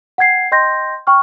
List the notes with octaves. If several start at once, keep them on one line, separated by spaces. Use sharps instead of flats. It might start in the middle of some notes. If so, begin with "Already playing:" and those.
F#5 G5 G#6 C7
D#5 G5 C6 G6 A#6
G5 C#6 F6